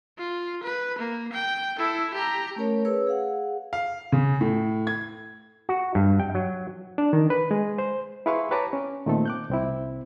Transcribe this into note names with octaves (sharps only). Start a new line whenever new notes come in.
F4
B4
A#3
G5
E4 A4
G4 A#5
A3 C#4 A#4 C#5
G#4 B4 C#5 E6
G#4 F5 F#5
F5
C#3
A2
G#6
F#4
G2
G5
F#3
D4
D#3
B4
G#3
C5
E4 G#4 B4 F5 C6 C#6
G4 B4 C#5 A5 A#5 D6
C#4
A#2 D#3 A3 C4 A4
D6 F#6 G6
C2 C4 E4